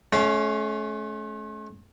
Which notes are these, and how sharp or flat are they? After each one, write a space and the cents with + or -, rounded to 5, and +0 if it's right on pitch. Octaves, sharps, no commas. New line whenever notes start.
A3 -40 C#4 +0 F5 +0